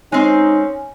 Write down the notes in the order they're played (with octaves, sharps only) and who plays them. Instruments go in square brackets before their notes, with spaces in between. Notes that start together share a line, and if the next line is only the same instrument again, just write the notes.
[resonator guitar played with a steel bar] G#3 C4 C5 [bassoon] C#4 [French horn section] D#4